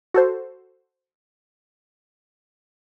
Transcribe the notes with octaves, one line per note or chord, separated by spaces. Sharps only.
F#4 A4 C5